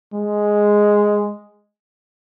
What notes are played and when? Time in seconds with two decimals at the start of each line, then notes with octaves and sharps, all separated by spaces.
0.14 G#3